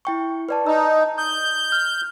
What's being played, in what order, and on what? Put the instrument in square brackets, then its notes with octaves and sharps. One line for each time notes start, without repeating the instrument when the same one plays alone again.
[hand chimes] E4 G5 C#6
B4 D5 A5
[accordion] D#4 [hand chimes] E6
[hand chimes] D#6 [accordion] G6
[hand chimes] F6